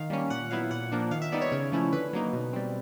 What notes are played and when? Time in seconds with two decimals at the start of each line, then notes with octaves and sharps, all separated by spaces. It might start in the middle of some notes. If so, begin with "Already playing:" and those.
Already playing: D#3 F5
0.10 G3 A#3 C#4
0.30 A#2 F#5
0.50 F#3 B3 E4 F5
0.71 A#2 F#5
0.92 F3 A#3 D4
1.11 D#3 F5
1.22 E5
1.32 G3 B3 D#4 D5
1.41 C#5
1.52 C#3 C#5
1.72 F3 A3 C#4 E4
1.93 D3 B4
2.13 F#3 A#3 D#4
2.33 B2
2.53 G3 C4